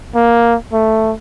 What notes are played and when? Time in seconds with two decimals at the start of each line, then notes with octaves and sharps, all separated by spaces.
0.15 A#3
0.73 A3